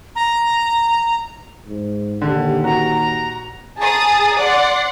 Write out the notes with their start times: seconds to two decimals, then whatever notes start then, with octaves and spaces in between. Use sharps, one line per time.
0.16 A#5
1.66 G#2
2.21 A#1 D#2 D3 G4
2.64 F#4 A#5
3.79 G#4 A5 A#5 D#6 A6
4.36 D5 F#5 C6